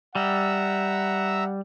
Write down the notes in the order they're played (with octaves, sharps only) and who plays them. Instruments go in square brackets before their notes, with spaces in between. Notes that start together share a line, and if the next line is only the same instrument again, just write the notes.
[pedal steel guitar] G3 [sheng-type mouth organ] E5 A#5 E6 [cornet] F#5